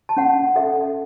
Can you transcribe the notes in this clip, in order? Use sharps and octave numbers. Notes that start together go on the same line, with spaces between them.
A5
C#4 F#5
A4 E5